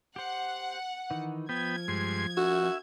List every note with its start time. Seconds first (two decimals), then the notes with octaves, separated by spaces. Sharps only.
0.16 G4 C5 F#5
1.10 D#3 E3 D#4
1.49 F3 B3 G5 G#6
1.88 G2 G#3 C6
2.37 F#4 E5